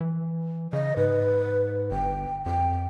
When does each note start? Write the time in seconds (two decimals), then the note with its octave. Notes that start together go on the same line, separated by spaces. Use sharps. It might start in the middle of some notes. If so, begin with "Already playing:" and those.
0.01 E3
0.73 C#3 D#5
0.97 G#2 B4
1.91 G1 G5
2.46 F2 G5